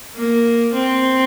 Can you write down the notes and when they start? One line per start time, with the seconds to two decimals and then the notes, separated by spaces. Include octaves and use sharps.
0.16 A#3
0.73 C4